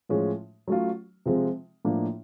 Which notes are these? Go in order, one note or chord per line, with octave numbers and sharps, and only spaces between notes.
A2 F3 G#3 C#4
F#3 A3 C#4 F4
C3 F3 G#3 C4 F4
A2 F3 A#3 D4